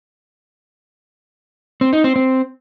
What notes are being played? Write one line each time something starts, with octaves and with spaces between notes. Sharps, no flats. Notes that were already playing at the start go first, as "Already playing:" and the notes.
C4
D#4
C4
C4